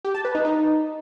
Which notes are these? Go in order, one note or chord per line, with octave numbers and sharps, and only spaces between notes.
G4
A5
B4
D#4
D#4